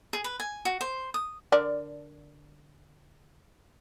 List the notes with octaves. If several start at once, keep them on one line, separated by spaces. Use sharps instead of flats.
G#4
B4
G#5
F#4
C5
D#6
D3 A#4 D5